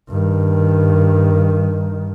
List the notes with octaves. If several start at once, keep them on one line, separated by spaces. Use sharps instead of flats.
G2 D#3